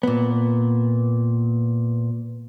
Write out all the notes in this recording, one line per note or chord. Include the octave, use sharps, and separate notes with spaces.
A#2 B3